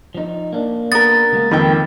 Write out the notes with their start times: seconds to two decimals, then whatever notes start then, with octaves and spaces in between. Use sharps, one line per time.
0.15 F3 D#4
0.53 A#3 D4
0.92 B3 A#4 A6
1.32 C#3 G#3 A#3
1.51 F2 D#3 D#4 B4 E5 G5